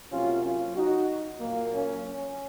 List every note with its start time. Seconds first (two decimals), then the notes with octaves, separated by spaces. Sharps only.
0.12 C3 F#3 A#3 C#4 F4
0.43 C#4 F4
0.75 D#4 F#4
1.40 A#2 F#3 A#3
1.72 C#4
2.03 C#4